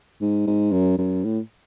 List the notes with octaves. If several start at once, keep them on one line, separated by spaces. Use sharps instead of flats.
G#2
G#2
F#2
F#2
A2